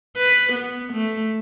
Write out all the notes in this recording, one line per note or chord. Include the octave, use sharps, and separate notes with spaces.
B4
B3
A3